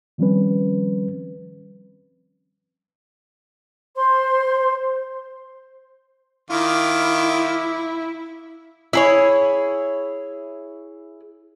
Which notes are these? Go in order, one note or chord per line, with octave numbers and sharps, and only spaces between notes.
D#3 F3 G3 C4 C#4 B4
C5 C6
D#3 E4 F4 D6
E4 G#4 C#5